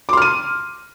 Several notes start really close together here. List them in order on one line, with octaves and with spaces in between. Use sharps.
D6 C6 F6 D#7